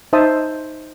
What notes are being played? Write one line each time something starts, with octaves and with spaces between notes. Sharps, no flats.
D#4 C5 E5 A5 D#6